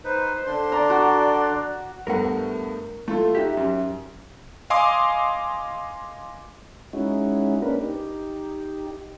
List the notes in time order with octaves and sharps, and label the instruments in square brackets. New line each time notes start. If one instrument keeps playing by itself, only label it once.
[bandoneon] D#4 B4 [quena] C5
[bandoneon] D3 D4 C6
[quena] D5 [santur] A#5
[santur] F#4
[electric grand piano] G2 A3 B3 [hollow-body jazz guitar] A#4 F#5
[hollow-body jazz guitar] A3 [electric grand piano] E4 F4 A4
[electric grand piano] D#4 F#4 [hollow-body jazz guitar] G4 E5
[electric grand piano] F#2
D#5 F5 G#5 C6 D6 D#6
[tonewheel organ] G#3 C#4 D#4 E4 F#4
A#3 C#4 D4 A#4 B4
D#4 G4